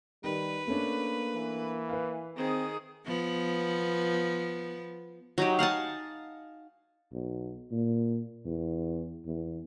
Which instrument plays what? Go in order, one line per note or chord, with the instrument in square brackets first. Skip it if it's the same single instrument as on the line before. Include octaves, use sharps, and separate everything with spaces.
[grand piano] D#3 [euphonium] G3 [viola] B4
[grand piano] A3 C#4 D4 [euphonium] A#3
[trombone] E3
[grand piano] B4 F5
[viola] D#3 G#4 [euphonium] C4
[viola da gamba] F3 B3
[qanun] F#3 D#4 G4
F5 F#5 G#5 A5
[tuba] B1
A#2
E2
E2